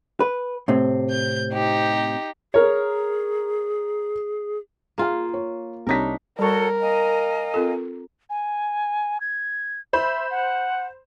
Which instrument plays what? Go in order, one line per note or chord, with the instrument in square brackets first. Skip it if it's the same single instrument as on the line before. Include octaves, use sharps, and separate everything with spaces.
[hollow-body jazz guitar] B4
A2 C3 C4
[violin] G6
D#4 G4
[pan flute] G#4 [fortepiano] A#4 C#5
[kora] A#3 F4 [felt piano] G#4 F5
[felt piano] C#5
[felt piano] C2 C#5 B6 [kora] D4 D#4 A#4
[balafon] G3 C#6 [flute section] F#4 A4 C#5 [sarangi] A#4
[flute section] D#5 F5 G#5
[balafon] C4 F4 A4
[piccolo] G#5
G#6
[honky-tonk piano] C5 B5 [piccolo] E5
[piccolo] F#5